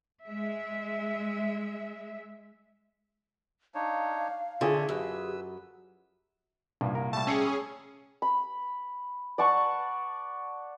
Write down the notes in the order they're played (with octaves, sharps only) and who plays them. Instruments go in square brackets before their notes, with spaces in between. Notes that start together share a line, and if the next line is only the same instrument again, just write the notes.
[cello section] G#3 E5
[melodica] D4 D#4 C#5 [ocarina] F5
[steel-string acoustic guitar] D3 [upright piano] F4 G#4 [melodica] C#5 E5
[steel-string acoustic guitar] F#2 [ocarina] G4 [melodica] B4 E6
[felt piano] C2 A#2 [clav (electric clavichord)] G2
[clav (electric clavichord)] A#4
[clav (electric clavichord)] G3 A3 [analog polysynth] A5
[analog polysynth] C#4 G#4 [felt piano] E6 C7 C#7
[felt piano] C#6
[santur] B5
D5 F#5 A5 C#6